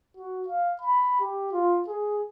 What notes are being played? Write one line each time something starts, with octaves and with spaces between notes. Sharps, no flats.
F#4
F5
B5
G4
F4
G#4